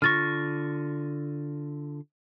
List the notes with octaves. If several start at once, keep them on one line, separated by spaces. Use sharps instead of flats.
D3 F4 C#6 F6 A6 A#6